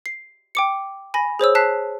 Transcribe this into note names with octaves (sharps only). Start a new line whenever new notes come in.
C7
G5 D6 C#7
G#5 B5 A#6
G#4 C5 C#5 E6
A5 F#6 B6 C7